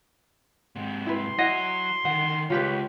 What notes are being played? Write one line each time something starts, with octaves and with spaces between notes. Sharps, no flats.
G#2 C3
E4 B4 C6
F#3 E4 F#4 D#5 F#5
D3 D#3 F#5
C#2 F4 G4 B4 C#5